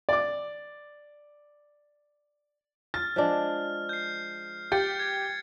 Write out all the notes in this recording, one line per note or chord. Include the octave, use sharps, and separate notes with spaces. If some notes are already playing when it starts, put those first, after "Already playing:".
D5 D6
F6 A6
F3 G#3 D4
G6 C7
G4 G6 A6 C#7
G#6 C#7